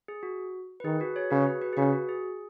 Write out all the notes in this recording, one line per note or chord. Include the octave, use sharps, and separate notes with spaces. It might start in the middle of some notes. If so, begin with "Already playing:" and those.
G#4
F#4
B4
D#3 G#4
F#4 B4
G#4 C#5
C#3 F#4 B4
G#4
F#4 B4
G#4
C#3 F#4 B4
F#4
G#4